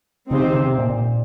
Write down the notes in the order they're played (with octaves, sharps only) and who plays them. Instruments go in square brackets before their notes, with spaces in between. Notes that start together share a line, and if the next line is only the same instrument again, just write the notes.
[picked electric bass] C#3 [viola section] C4 D#4 G4 C5
[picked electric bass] D#3
C#3
C3
A#2
A#2